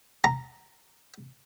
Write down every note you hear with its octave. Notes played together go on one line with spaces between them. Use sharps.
A#5